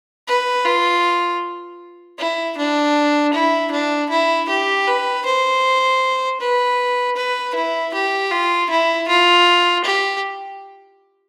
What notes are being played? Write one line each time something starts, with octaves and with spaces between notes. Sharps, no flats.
B4
F4
E4
D4
E4
D4
E4
G4
B4
C5
B4
B4
E4
G4
F4
E4
F4
G4